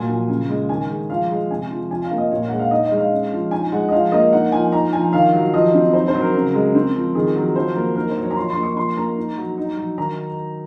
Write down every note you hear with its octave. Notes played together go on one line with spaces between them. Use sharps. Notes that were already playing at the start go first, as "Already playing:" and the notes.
Already playing: A#2 F#3 G#5
F3
C#3
G#3
D#3 G#5
G#3
F3 F5
G#3
C3 G#5
F3
F3 G#5
F5
A#3
D#5
A#2 C#5
G#3 F#5
F5
D#4 D#5
D#5
G#3
F5
C#4
F3
D#4 G#5
G#3 F#5
D#5
F3 F5
A#3 D#5
D#4 F#5
F3 G#5
D#4 A#5
F3 G#5
D#3 F5
F#3
F3 D#5
C4
D#4 C5
C5
F#3
A#4
C#3
G#3
C4
F3
D#3 G#4
F#3 A#4
F3 C5
A#3 A#4
D#4 A#4
C5
F#3
C#5
A#5
F3 C6
C6
A#3
C#6
F3 C6
A#3 A#5
D#4
F#3
D#4
F#3
D#3 A#5